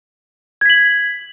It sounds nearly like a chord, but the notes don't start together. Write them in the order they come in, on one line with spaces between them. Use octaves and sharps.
G#6 B6 F#7